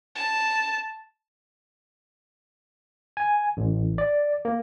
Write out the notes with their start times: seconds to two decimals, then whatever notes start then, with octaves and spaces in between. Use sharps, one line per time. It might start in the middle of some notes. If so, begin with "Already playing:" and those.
0.15 A5
3.17 G#5
3.57 A1
3.98 D5
4.45 A#3